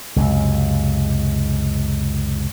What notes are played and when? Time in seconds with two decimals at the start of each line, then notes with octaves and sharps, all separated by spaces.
0.16 C#2 F#2 C3